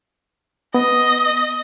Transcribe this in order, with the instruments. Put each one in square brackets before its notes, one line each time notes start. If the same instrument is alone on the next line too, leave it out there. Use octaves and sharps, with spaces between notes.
[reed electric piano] B3 [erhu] D#5